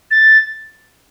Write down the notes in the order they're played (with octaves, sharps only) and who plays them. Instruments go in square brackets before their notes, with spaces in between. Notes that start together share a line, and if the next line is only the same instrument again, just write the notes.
[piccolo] A6